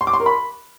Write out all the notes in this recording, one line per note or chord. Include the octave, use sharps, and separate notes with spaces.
C6
D6
C6
A#4
B5